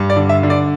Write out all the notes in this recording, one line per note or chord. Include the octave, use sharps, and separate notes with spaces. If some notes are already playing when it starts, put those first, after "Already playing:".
Already playing: G2
D5
D3
E5
D3
D5